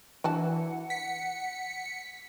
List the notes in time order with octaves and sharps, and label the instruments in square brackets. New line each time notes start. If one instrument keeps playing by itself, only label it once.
[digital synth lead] E3 [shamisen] D4 F#4 A5 [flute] F#5
[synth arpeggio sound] B6 [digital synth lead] C#7